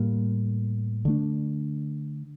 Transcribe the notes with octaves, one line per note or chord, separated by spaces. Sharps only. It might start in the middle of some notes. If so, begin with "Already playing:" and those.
Already playing: A2 G3 A#3
D3 A3 D4